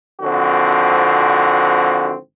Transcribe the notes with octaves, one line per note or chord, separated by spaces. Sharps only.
G#1 D3 F3 C4 F#4